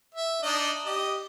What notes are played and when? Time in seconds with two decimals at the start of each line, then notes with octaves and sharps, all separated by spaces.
0.15 E5
0.43 D4 D#4 D#5
0.85 G4 D#5